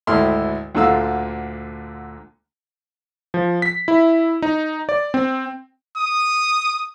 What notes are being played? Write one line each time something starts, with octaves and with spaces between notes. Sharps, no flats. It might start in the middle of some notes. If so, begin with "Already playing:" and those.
G#1 D2 A3 E4 C6 F6
D2 A#2 D3 A4 F5 E6
F3
B6
E4
D#4
D5
C4
D#6